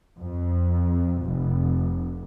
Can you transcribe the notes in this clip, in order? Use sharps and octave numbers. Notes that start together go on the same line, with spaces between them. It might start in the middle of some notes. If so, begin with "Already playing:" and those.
F2
F1